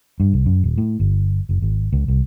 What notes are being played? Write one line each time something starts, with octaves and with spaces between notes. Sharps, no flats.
G2
C2
F#2
D#1
A2
G1
F#1
G#1
C#2
C2